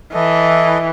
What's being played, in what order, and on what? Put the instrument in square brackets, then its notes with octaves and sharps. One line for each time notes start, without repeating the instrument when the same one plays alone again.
[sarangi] E3 [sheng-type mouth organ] E4 A4 D#5